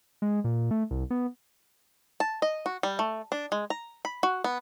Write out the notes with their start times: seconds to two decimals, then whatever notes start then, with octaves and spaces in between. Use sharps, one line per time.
0.22 G#3
0.44 A#2
0.71 A3
0.91 C2
1.10 B3
2.20 A5
2.42 D#5
2.66 F#4
2.83 G3
2.99 A3
3.32 D4
3.52 G#3
3.70 A#5
4.05 B5
4.23 F#4
4.44 B3